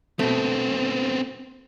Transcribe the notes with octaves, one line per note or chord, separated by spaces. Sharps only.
B2 A3 B3 C4